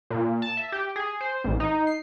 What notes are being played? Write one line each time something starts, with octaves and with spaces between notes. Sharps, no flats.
A#2
A5
E5
G4
G#4
C5
A1
D#4
C7